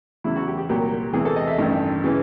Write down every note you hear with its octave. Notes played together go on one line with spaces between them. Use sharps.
E2 C#3 F#3 E4
F#4
G4
G4
C2 A#2 F#3 G4
E2 C3 E3 G#4
A4
D#5
E5
A1 G2 D#3
C#3 E3